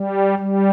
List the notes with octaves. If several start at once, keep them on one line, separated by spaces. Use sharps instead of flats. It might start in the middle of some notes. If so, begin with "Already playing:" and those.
Already playing: G3
G3